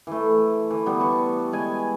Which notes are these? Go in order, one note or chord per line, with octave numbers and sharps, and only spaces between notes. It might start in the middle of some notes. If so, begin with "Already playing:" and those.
E3 A3
E3
G3 B3
A5 C#6
G#3 G#5